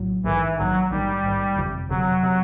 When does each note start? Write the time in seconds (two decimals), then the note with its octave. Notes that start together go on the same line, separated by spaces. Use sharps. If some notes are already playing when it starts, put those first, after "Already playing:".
Already playing: A#1 A2 F#3
0.24 A#1 G#2 D#3 E3
0.58 A#1 G#2 D#3 F#3
0.90 A#1 G#2 D#3 G3
1.24 A#1 G#2 D#3
1.56 G1 F2 C3
1.89 G1 F2 C3 F#3
2.23 C3